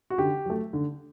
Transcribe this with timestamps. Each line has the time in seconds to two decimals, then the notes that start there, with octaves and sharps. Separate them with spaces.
0.10 F#4
0.18 D3 G4
0.46 F#3 A3
0.73 D3